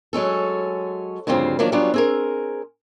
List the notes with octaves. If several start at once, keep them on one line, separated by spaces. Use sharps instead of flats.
F#3 G#3 C#4 A4
D2 G2 C#3 F3 C4 F5
D#3 F3 F#3 A#3 D4
F#3 G3 B3 C#4 D4 F4
C4 G#4 A#4